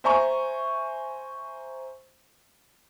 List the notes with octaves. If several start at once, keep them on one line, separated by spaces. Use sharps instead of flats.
C5 E5 G#5 A#5 C#6